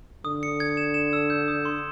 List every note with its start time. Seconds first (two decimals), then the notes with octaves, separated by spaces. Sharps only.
0.25 D3 D#6
0.43 C#7
0.60 G#6
0.77 E7
0.94 E7
1.13 E6
1.30 G6
1.48 D#6
1.65 C6